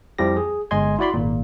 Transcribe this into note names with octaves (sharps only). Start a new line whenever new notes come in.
F2 F3 G3 E4 G4 A#6
G#4
G1 G#3 D#5 G#5 C6 G#6
E4 F#4 D5 B5 C6
G#1 A#2